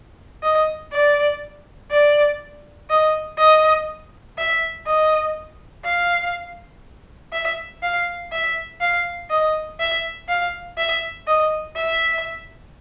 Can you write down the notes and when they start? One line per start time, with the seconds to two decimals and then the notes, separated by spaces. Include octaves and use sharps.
0.43 D#5
0.92 D5
1.91 D5
2.90 D#5
3.38 D#5
4.38 E5
4.87 D#5
5.85 F5
7.32 E5
7.83 F5
8.32 E5
8.81 F5
9.30 D#5
9.80 E5
10.28 F5
10.77 E5
11.27 D#5
11.76 E5